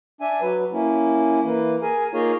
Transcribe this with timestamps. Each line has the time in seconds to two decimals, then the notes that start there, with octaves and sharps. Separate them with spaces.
0.21 D4 E5 G#5
0.41 F#3 B4
0.73 A#3 C#4 E4
1.44 E3 A#3
1.82 G#4 A#4 G#5
2.14 A#3 D#4 F4 G#4 A#4 C#5